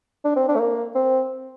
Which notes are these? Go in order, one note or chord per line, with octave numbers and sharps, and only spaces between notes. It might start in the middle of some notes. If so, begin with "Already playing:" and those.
D4
C4
D4
A3
A#3
C4